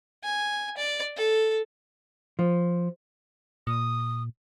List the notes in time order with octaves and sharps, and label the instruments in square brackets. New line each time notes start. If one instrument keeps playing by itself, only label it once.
[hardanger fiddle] G#5
D5
A4
[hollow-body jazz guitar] F3
[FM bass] A#2 [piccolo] D#6